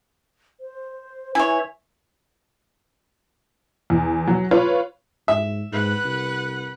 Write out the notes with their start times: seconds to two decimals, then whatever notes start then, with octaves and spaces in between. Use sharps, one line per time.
0.60 C5
1.35 E4 B4 C#5 E5 G#5
3.90 E2
4.27 F#3
4.51 F4 B4 C#5
5.28 G#2 E5
5.72 G#2 B4 F#5
6.04 C2